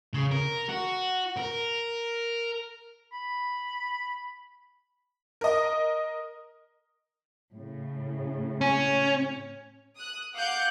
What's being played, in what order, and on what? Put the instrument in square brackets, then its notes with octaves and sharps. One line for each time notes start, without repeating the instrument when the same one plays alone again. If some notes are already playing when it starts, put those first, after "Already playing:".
[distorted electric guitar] C#3
A#4
F#4
A#4
[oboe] B5
[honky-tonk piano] A#4 D#5
[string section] A2 C#3
[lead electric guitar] C#4
[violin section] D#6 F#6
F5 F#5 D6 F#6 G6 C#7